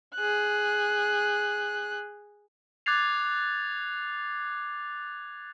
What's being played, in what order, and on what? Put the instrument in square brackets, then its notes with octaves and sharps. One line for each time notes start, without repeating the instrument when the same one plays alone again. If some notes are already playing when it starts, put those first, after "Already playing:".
[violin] G#4 F#6
[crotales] D6 F#6 G#6 A6 C7 F7